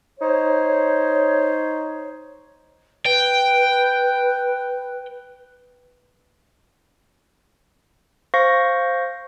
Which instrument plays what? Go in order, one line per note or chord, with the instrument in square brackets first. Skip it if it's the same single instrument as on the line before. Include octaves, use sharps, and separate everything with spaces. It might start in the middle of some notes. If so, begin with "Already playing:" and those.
[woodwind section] D#4 C5 C#5
[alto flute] B4 [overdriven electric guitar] G5
[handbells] C5 F5 C#6 A#6